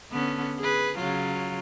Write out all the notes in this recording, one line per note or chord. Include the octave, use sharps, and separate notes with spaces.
D3 B3 C#4
G#4 B4
C#3 F#3 F4